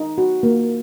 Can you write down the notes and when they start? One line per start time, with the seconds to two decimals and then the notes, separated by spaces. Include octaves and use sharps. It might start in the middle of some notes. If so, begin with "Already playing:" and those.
Already playing: D#4
0.18 F#4
0.43 A#3